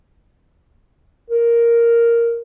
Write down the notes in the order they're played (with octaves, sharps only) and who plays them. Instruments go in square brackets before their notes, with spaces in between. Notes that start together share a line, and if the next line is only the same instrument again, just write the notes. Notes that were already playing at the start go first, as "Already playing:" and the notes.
[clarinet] A#4